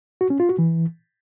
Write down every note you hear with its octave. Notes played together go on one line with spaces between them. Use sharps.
F#4
C#4
F4
F#4
E3